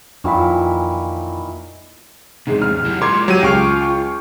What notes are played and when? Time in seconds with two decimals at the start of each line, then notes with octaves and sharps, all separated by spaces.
0.24 F2 A#2 D#3 E3 F4 B5
2.47 E2 G#2 C3 G#3
2.62 F6
2.85 F#3 E4 G4
3.02 G#3 F4 A#4 C6 D6 G#6
3.28 F#3 G4 D#7
3.43 C#2 F4 G5 C#6 F6 D7